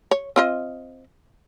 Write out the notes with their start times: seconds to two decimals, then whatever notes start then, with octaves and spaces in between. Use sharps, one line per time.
0.11 C#5
0.36 C4 F4 D#5